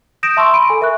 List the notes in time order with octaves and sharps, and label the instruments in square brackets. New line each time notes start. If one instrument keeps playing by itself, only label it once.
[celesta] D#6 G6 A#6 D7 E7
E5 A5 C6 C#6 E6
B5 C6 D7 D#7
A4 G#5
A#4 E5 C#6 F#6